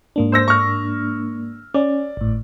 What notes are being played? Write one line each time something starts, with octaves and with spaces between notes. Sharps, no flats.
G#2 A#3 D4
C5 E6 A#6
C#6 F6
C#4 D5
G#1 A2